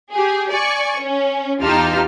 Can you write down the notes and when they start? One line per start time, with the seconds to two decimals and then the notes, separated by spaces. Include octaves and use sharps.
0.13 G4 G#4
0.51 D5 G#5 C#6
1.00 C#4
1.62 E2 D#4 F4 G4 A5 F6